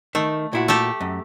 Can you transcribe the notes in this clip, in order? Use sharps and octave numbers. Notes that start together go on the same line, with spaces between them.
D#3 A3
A#2 E4 F#4
A3 G4 A4
F#2